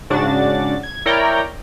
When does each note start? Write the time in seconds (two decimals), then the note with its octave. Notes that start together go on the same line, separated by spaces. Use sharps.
0.10 G#2 C#3 D4 F#4 A6
0.83 G#6
1.06 E4 A#4 C#5 D5 G5 A#5